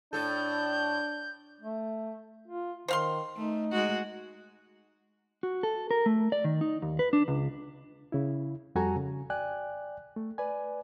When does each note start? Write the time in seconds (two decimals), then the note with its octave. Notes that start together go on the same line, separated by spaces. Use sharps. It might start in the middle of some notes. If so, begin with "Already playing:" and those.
0.13 A2 D4 A4 G6
1.61 A3
2.48 F4
2.88 D#3 C5 F5 C6
3.36 A3 D#4
3.72 G#3 F#4
5.43 F#4
5.63 A4
5.91 A#4
6.06 A3
6.32 D5
6.44 D#3
6.61 D#4
6.82 D#2
6.99 B4
7.13 D4
7.28 C#2
8.12 C#3 E4
8.75 F2 G3 F#4 A4 G#5 A#5
8.96 C#3
9.30 D5 G5 G#5 F#6
10.16 A3
10.38 B4 D5 G#5